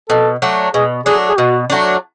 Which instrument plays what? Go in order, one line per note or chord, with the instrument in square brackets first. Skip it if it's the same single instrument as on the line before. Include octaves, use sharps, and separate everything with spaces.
[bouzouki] B2 [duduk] A4
[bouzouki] F#3 A3 D4
[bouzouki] B2 [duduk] G#4
[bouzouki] F#3 A3 D4 [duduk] G#4
[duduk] G#4
[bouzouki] B2 [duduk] F#4
[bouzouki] F#3 A3 D4